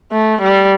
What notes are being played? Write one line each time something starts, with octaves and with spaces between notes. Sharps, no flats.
A3
G3